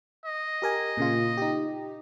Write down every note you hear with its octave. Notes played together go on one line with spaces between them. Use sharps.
D#5
G4 A#4 G#5
A#2 C#3 F4
D#4 G4